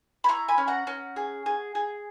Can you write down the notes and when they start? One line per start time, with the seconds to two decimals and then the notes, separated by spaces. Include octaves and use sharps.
0.24 B5
0.28 E4 A#5 C#6
0.49 G#5 B5
0.58 C#4
0.68 F#5 A#5
0.87 C#4
1.16 G#4
1.46 G#4
1.75 G#4